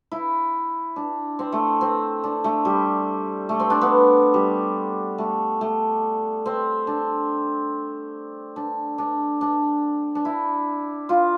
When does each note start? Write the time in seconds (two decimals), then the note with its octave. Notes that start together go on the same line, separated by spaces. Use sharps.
0.12 E4
0.96 D4
1.39 C4
1.52 A3
1.81 C4
2.24 D4
2.44 A3
2.65 G3
3.49 A3
3.60 C4
3.70 D4
3.81 B3
4.34 G3
5.18 A3
5.61 A3
6.46 C4
6.87 D4
8.56 D4
8.98 D4
9.41 D4
10.15 D4
10.25 E4
11.09 F4